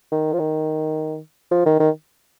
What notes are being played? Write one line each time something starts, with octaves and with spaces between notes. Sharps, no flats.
D#3
F3
D#3
F3
D#3
D#3